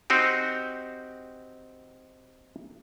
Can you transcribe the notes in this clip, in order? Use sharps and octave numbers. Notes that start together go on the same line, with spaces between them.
C4 D#4 F#4 G4